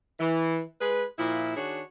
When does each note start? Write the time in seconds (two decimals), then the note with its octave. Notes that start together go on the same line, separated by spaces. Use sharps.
0.19 E3
0.80 G#3 G#4 B4
1.17 A#2 F3 E4
1.56 D#3 D4 F#4 G#4 C#5